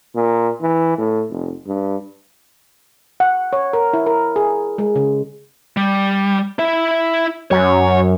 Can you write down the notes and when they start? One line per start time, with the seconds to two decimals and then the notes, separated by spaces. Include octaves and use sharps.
0.15 A#2
0.61 E3
0.98 A2
1.29 F1
1.66 G2
3.20 F#5
3.53 C#5
3.73 A#4
3.93 E4
4.06 A#4
4.36 G#4
4.78 G#3
4.96 C#3
5.77 G3
6.59 E4 E5
7.51 F#2 C#5